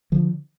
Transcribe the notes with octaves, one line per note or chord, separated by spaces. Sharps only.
D3 F3